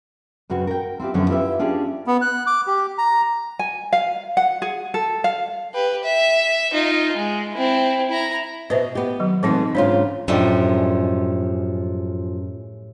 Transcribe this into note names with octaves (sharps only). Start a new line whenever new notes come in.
F#2 C#3 C4 F#4 B4
A#4 G5
C4 E4 F4 G4
F#2 B2 D3 F3 C4 C#4
E4 F4 G4 B4 D#5 E5
C#4 D4 F4 G4 G#4
B3
F#6
D6
G4
A#5
G#5
F5
F#5
G#4
A4
F5
G4 B4
E5
D#4 F4
G#3
C4 E4
E4 A#5
B2 B4 C5 D#5 E5
B3 G4
D#3 F#3
B2 E3 G#3 A3 C4 D#4
G#2 C#3 D4 F4 C#5
F#2 A2 F3 G3 G#3 D4